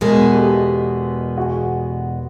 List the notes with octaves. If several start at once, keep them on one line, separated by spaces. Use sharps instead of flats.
E2 B2 G#3 B3 G#4 A#4
G4 A4
F#4 G#4